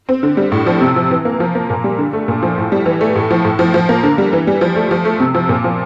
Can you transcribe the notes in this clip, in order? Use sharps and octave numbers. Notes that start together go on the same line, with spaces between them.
C4
D3
G3
A2
F3
C3
F3
E3
A#3
F3
A#3
A#2
G3
D3
A3
A#2
F3
A2
G3
E3
A3
A2
F3
A2
F3
F3
A#3
D3
G3
E3
G3
F3
A3
F3
A3
C3
F3
A#2
F3